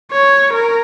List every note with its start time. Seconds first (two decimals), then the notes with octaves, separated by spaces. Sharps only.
0.12 C#5
0.53 A#4